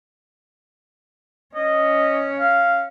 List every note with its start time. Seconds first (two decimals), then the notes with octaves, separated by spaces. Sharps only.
1.55 C#4 D#5
2.39 F5